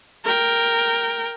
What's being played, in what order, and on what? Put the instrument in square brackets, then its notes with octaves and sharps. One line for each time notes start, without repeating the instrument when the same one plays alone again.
[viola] A#4 G5